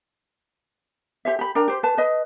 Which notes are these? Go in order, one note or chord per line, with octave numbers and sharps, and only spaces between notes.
G4 C5 E5
G4 B5
D4 A#4 G5 A#5
G4 C5
B4 A5
B4 D#5